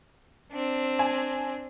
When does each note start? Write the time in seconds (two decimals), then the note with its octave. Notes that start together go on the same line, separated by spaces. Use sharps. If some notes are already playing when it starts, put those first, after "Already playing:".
0.51 C4 D4
0.99 G#5 A5